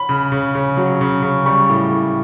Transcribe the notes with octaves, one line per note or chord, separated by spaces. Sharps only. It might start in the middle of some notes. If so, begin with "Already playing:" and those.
Already playing: B5
C#3
C#3
C#3
F#3
C#3
C#3
G3 C#6
A2
A2